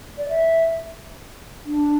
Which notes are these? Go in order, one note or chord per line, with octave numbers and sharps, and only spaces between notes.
D5
E5
D4